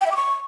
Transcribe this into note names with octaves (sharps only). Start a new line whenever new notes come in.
G5
E5
D6
C#6